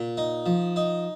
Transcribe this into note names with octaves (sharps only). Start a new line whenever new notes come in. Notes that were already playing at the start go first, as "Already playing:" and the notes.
Already playing: A#2
D#4
F3
D#4